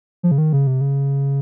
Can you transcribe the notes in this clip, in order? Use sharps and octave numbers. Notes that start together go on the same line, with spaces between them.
F3
C#3
D#3
C#3
C3
C#3